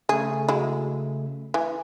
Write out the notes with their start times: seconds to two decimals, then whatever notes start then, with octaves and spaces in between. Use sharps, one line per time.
0.09 C#3 A3 G#4
0.48 F#3 G#3 E4
1.54 E3